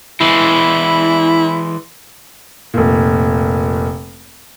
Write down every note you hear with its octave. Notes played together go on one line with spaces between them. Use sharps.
E3 G#3 E4
F1 A#2